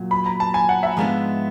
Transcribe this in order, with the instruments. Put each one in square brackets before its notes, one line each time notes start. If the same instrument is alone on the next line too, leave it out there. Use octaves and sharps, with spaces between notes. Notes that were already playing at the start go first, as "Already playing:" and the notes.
Already playing: [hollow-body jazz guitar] A#2 F#3
[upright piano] B5
A#5
A5
G#5
F#5
E5
[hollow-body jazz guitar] G#2 F3 G#3 B3 D4